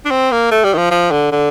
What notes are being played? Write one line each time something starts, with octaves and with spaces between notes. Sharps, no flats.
D4
C4
A#3
A3
G3
D#3
F3
F3
D3
D3